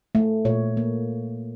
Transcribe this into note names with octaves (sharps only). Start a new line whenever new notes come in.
A3
A#2 C#5
A#3